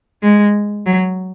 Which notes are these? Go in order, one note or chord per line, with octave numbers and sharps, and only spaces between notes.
G#3
F#3